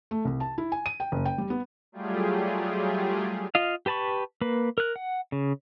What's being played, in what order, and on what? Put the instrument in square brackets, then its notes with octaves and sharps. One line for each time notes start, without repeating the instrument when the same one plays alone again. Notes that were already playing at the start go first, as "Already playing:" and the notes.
[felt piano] A3
C2
A5
E4
G#5
D#7
G5
F#1
G5
G3
B3
[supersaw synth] F#3 G3 A3 F4 G4 G#4
[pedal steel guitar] F4 D#5 F5
G4 B4 A5 B5 C#6
A#3 B4
A#4 F#6
F#5
C#3